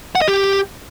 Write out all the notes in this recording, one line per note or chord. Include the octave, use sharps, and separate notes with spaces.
F#5
D#5
G4